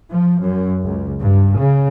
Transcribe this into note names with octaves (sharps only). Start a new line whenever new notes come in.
F3
F#2
C#2
G2
C#3